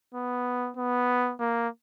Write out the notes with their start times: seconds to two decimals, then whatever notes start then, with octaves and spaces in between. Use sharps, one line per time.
0.14 B3
0.77 B3
1.40 A#3